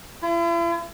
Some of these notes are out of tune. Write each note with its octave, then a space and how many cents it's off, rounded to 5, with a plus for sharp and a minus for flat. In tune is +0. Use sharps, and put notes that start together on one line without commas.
E4 +45